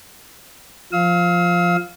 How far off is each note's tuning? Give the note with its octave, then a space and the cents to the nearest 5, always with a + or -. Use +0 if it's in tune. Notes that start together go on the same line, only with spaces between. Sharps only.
F3 +0 F5 +0 E6 -45